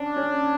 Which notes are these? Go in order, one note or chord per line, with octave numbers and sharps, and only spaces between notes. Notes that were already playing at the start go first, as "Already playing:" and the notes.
Already playing: C#4 D4
C#4